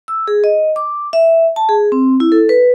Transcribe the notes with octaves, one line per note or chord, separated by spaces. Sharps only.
E6
G#4
D#5
D6
E5
A5
G#4
C4
E4
A4
B4